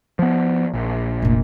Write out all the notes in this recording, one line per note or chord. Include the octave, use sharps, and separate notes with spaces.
F3 B3
A#1
F1 A#2